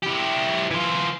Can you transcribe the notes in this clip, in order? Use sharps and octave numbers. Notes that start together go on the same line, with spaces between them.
E4 G4
E3 F4